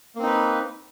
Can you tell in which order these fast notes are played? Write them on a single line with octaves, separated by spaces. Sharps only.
A#3 C4 D#4 B4